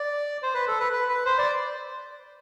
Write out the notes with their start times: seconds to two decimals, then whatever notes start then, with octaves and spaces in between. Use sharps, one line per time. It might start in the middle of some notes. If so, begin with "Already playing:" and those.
Already playing: D5
0.43 C5
0.54 B4
0.68 A4
0.80 B4
0.92 B4
1.08 B4
1.25 C5
1.38 D5